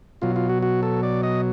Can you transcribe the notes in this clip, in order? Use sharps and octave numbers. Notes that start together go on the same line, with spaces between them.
B2 F#3 F4
F4
F#4
F#4
A4
D5
D#5